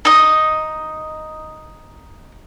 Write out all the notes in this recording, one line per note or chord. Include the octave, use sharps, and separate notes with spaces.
D#4 D#5